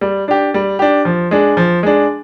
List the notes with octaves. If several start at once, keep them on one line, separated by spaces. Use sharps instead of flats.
G3
D4 G4
G3
D4 G4
F3
G#3 D4
F3
G#3 D4